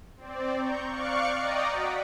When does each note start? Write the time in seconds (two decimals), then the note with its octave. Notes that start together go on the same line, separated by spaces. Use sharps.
0.17 C4 D5
0.56 A#5 C#6 G6
0.89 D5 F5 C#6 D6 F#6 C#7
1.37 D5 D#5 G5 A#5 D#6
1.72 F#4 F#5 B6 D7